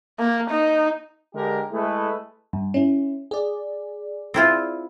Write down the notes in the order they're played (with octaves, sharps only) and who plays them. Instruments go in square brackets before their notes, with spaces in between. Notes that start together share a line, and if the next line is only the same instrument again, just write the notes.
[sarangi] A#3
D#4
[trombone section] D3 G#3 G4 G#4 A#4
G#3 A3 E4 G#4 A4 B4
[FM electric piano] G2
C#4 E4
G#4 D5
[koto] C4 E4 F4